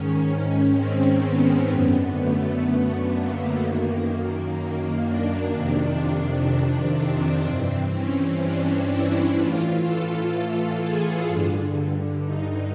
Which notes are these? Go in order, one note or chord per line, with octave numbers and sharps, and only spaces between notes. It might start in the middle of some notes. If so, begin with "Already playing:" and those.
Already playing: G#2 D#3 C#4
C#4
C4
B3
F#2 D3 B3
A3
A#3
F#2 D#3
A#3
D4
F2 C3 D#3
D4
C4
G2 E3 C4
C#4
D4
E4
A2 E3 F4
A4
G#4
G2 D3
D#4